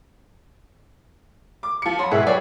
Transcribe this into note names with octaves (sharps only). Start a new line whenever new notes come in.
D6
F3 C#7
F#3 B5 C6
G#2 B2 E4 G#4 E5 F#5
F#3 G3 C#5 D5